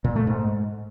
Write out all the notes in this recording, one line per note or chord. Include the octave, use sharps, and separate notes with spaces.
A#2
A3
G#2